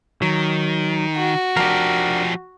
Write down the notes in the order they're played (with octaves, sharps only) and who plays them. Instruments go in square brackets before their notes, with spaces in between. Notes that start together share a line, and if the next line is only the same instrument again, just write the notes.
[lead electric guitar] D#3 [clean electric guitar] F#3
[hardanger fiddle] F#4
[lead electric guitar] F3 G4 [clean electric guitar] D4 A#4